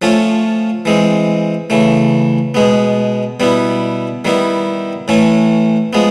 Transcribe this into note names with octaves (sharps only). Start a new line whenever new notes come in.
F3 A3 C#4 F4
E3 G#3 C4
C#3 E3 A3
B2 G#3 B3
B2 G3 B3 E4
D#3 G3 B3 E4
A2 E3 A3 C#4
F3 G#3 B3